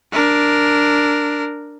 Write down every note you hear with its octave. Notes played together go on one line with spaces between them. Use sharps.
D4 A#4